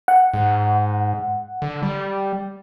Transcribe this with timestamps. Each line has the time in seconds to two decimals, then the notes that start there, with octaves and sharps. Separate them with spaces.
0.08 F#5
0.34 G#2
1.62 D3
1.83 G3